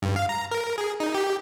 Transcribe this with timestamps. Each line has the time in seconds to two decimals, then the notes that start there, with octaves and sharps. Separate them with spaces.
0.02 G2
0.16 F5
0.29 A#5
0.51 A#4
0.78 G#4
1.00 D#4
1.14 G4